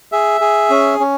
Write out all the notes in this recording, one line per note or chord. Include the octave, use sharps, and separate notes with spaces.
G#4 E5
G#4
C#4
C#4